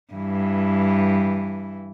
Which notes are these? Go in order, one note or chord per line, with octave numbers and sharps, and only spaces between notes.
G2 E3